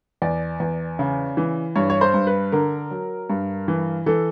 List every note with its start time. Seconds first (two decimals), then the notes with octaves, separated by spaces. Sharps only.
0.22 E2 D5
0.60 E2
0.99 C#3
1.37 E3
1.75 G2 C#5
1.90 C#5
2.01 C5
2.14 G2
2.27 B4
2.52 D3 A#4
2.91 F#3
3.30 G2
3.68 E3
4.06 E3 A4